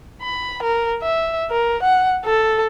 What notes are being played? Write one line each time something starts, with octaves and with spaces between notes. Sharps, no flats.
B5
A#4
E5
A#4
F#5
A4